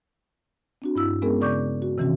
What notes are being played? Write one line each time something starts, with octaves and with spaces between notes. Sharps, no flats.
C4 D4 F#4
G2 E4 E6
G#3 B3 C#4 G#4 A#4
C#3 D5 C#6 D6 G6
F#4
C3 D#3 E3 C4 C#4 F#4